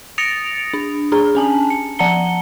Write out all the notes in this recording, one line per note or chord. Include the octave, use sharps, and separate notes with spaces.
D#6 A6 A#6 C#7 D7 F7
D4
D4 G#4 A#5
C#4 G#5 A5
C#7
F3 F#5 A5 A#5 C#7 G7